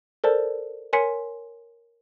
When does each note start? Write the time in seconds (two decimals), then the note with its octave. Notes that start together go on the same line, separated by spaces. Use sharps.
0.24 A4 A#4 C5 D5 A5
0.93 A#4 C#5 G#5 C6 B6 C#7